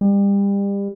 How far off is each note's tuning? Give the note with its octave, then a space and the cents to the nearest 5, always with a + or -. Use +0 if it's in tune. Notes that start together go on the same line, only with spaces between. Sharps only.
G3 +30